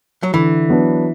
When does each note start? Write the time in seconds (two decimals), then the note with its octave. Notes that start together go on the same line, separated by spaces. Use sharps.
0.23 F#3
0.34 D3 E3
0.69 F#3 B3 D4